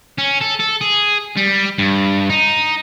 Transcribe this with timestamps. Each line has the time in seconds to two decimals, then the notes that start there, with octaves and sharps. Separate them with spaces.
0.19 C#4
0.41 A4
0.60 A4
0.81 G#4
1.37 G3
1.78 G2
2.30 D#4